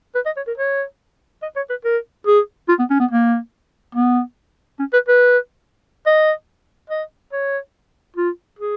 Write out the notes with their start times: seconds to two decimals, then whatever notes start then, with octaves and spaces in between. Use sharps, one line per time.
0.15 B4
0.26 D#5
0.37 C#5
0.47 A#4
0.57 C#5
1.42 D#5
1.56 C#5
1.70 B4
1.84 A#4
2.27 G#4
2.69 F4
2.79 B3
2.90 C#4
3.00 B3
3.11 A#3
3.95 B3
4.79 C#4
4.93 B4
5.08 B4
6.06 D#5
6.90 D#5
7.33 C#5
8.17 F4
8.59 G#4